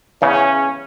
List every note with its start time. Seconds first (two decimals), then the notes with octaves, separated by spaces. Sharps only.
0.22 E2 C#3 C#4